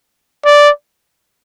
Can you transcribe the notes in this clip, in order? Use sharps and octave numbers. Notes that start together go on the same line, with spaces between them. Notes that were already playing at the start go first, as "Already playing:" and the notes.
D5